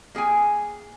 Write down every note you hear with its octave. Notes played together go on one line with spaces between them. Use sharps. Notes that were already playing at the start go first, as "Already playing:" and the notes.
A#3 G#4 G5 G#5